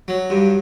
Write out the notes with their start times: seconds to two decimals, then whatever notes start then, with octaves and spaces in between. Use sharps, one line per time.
0.08 F#3
0.30 G2